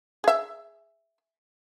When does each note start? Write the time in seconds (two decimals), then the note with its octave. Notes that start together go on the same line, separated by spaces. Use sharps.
0.24 G#4 E5